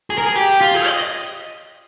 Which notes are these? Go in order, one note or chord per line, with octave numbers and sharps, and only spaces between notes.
G#4
A#4
G#4
G4
F4
G#4
D#5